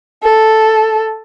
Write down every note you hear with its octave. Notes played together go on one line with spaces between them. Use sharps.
A4